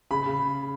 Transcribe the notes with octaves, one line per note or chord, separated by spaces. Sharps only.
C#3 B5
C#3